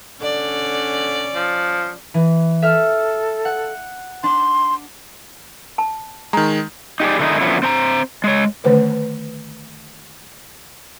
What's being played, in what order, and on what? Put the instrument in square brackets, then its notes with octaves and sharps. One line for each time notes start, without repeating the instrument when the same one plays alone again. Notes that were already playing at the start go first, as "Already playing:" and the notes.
[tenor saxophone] D3 [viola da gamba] C#4 D5
[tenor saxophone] F3
[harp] E3
[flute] A4 [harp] E5 F6
[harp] F#5
[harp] D4 [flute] C6
[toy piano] A5
[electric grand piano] D#3 G#3 [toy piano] A#5
[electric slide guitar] D#4 G4 G#4 D5
D3 D#3 G#3 C#4 D#4 E4
D3 F3 F#3 B3 C#4 E4
C4 C5 A5 A#5
G#3 C#5
[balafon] D3 D#3 A3 B4 C5